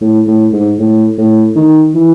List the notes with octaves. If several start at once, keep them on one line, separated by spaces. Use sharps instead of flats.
A2
A2
G#2
A2
A2
D#3
E3